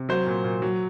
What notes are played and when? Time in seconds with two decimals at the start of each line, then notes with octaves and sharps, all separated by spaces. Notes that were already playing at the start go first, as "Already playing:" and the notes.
Already playing: C3
0.09 F#3 C5
0.27 A#2
0.44 A#2
0.62 F#3